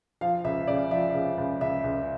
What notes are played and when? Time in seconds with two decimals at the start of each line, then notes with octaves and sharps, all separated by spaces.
0.21 F3 F5
0.44 C#2 E5
0.67 C#3 D5
0.91 F3 E5
1.14 C#3
1.38 C#2
1.61 C#2 E5
1.84 C#2